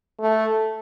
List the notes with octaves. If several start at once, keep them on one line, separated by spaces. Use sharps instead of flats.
A3